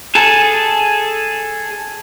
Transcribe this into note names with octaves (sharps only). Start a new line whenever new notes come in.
G#4 A4